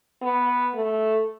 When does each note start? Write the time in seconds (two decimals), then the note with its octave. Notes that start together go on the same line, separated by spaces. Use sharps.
0.22 B3
0.75 A3